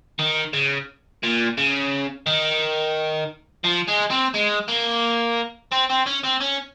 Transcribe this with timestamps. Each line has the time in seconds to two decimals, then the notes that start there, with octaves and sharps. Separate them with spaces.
0.19 D#3
0.53 C#3
1.23 A#2
1.57 C#3
2.26 D#3
3.64 F3
3.88 G#3
4.10 C4
4.34 G#3
4.68 A#3
5.72 C4
5.90 C4
6.06 C#4
6.24 C4
6.41 C#4